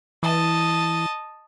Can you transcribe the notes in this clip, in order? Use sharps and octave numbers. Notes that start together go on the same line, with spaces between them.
E3 D#5 A5